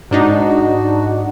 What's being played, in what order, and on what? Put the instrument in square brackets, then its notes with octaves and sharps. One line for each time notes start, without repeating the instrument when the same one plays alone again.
[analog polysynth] G#2 D4 D#4 [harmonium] F#4